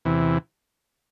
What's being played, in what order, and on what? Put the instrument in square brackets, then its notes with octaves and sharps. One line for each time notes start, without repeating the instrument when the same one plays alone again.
[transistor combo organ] E2 C3 E3